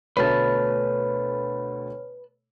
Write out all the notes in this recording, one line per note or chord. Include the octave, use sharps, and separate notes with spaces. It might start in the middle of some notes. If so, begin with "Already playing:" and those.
D2 B2 A3 B4 C#5 A5 F6